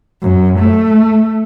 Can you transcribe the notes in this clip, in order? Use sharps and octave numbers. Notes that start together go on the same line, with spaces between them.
F#2
A3